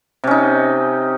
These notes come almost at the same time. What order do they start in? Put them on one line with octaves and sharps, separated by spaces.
C3 C#4 D#4